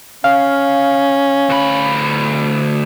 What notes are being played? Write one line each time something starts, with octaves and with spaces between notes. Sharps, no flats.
C#4 F5
D2 B5